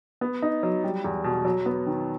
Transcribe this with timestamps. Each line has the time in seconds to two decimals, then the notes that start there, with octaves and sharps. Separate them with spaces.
0.21 B3
0.42 D#4
0.63 F#3
0.84 G3
1.04 E2
1.24 B2
1.45 F#3
1.66 B3
1.86 D#3